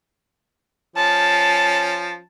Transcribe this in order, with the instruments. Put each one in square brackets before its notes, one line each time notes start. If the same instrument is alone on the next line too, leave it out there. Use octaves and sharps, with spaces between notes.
[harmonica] F3 C#4 [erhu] A5